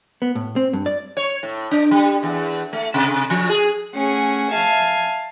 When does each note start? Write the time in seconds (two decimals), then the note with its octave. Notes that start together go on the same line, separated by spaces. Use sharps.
0.22 B3
0.35 A2
0.56 C4
0.73 G2
0.86 D5
1.17 C#5
1.43 A2
1.71 D4
1.91 G3
2.23 E2
2.73 A3
2.94 C3
3.30 F3
3.50 G#4
3.93 A3 C#4 G#4 F#5
4.52 E5 F5 G#5 A5